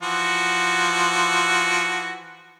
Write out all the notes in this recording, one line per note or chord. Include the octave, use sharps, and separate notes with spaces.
E3 F3 F#4